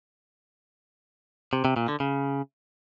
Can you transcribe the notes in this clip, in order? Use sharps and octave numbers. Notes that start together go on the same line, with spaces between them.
C3
C3
A#2
D3
C#3